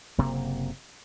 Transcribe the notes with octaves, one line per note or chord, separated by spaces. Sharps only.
F#1 C3 A#3